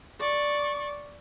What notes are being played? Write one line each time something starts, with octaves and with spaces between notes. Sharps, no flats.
D5 C#6